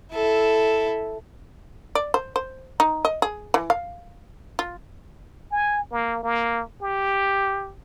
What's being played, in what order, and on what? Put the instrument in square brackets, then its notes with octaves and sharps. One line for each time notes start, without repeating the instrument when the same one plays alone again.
[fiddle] E4 A4
[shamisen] D5
C5
C5
D#4
D#5
G#4
E3
F5
F4
[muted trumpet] G#5
A#3
A#3
G4